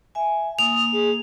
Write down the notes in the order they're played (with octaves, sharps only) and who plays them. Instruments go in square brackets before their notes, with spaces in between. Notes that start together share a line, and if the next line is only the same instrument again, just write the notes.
[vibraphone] E5 G#5
[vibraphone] A#3 [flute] D#6 [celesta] F7
[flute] G#4